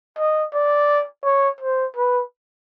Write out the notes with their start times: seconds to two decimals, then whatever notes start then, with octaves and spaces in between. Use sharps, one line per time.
0.18 D#5
0.54 D5
1.24 C#5
1.60 C5
1.96 B4